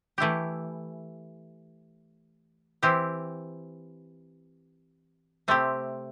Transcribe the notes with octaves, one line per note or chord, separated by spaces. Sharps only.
E3 A3 E4 G4
E3 C4 E4 G4
C3 A3 C4 G4